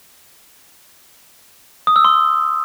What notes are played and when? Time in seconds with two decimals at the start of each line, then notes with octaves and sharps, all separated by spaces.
1.87 D#6
1.96 E6
2.05 C6